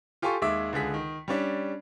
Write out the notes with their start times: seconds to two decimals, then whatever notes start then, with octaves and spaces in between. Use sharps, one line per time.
0.22 F4 G4 A4 G#5 C6 C#6
0.42 D#2 G#3 E5 D6
0.73 C#2 D3 G#4 B6
0.94 D#3
1.28 G3 C#4 D4